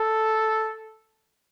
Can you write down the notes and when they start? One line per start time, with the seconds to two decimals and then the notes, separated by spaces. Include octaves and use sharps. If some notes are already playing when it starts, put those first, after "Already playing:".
Already playing: A4